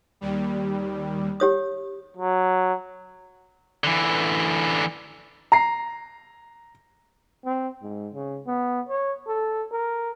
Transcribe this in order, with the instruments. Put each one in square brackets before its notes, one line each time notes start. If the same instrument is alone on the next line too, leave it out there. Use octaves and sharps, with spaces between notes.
[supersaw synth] D#2 G3
[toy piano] G4 C#5 D#6
[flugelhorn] F#3
[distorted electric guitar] D3 E3
[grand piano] A#5 C7
[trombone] C4
G#2
C#3
B3
C#5
A4
A#4